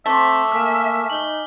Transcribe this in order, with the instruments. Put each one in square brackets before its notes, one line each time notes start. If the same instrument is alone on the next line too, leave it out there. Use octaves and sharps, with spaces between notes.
[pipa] A3 [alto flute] C4 [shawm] E5 [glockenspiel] D6 B6
[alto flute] A#3 [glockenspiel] G#5 F6
[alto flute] D#4 [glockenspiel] F#7 G7